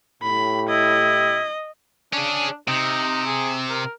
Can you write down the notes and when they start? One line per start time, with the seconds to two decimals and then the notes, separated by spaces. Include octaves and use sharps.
0.23 A2 G4 B5
0.69 E4 D#5
2.13 C#4 D4 G#4
2.68 C3 D#4
3.26 G#4
3.70 A#4